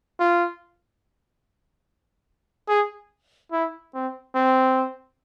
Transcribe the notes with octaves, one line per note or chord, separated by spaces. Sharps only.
F4
G#4
E4
C4
C4